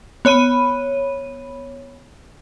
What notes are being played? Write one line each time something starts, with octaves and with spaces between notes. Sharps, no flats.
B3 C#5 B5 D#7